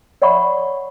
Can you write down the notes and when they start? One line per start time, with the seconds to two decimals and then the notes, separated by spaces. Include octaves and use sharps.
0.22 C#5 D5 E5 F#5 B5 C#6